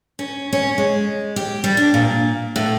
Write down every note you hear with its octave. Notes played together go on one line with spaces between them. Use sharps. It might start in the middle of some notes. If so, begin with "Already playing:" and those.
C#4
C#4
G#3
G4
G3
D4
A#2
A2